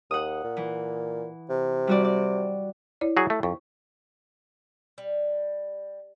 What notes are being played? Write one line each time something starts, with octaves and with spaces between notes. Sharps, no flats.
D#2 F#5 D#6
A#2
E3
C3
G3 F#4 D5
D5
E4 C#5 D5
F#3 F#4 G#4
A3
F2 C#6
G3